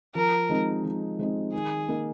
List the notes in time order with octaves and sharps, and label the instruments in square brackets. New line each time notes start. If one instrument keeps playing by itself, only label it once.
[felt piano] F3 [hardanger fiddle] A#4
[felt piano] G#3 C4 D#4
F3
G#3 C4 D#4
[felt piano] D#3 [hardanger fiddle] G#4
[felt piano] A#3 D#4